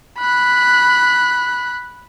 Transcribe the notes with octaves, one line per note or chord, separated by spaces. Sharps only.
B5 F#6